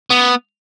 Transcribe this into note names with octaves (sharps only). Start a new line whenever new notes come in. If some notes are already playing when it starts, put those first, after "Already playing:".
B3